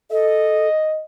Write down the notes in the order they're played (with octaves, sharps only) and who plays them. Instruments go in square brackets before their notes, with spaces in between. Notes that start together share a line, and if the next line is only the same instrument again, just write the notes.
[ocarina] A4 [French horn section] D#5